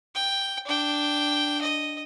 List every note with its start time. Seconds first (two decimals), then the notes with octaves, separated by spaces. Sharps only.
0.15 G5
0.66 D4 G5
1.61 D#5